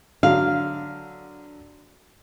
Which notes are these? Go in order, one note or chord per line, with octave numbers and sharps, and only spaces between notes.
D3 F#3 F5